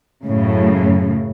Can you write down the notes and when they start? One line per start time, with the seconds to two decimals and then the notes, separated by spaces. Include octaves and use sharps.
0.24 F#2 A2 C#3